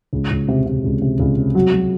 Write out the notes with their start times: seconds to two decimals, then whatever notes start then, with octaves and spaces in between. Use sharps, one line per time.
0.13 C#2
0.31 C#2
0.48 C3
0.67 C3
0.84 C#2
1.02 C3
1.19 C#2
1.37 C3
1.55 F#3
1.73 F#3